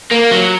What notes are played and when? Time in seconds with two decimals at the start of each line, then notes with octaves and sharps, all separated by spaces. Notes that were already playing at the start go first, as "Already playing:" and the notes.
0.11 A#3
0.31 F#3